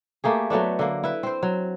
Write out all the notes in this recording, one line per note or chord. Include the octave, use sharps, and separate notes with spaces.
A3 A#3 G4 G#4
F#3 A3 B3 D4
D3 A#3
E4 B4
C4 C5
F#3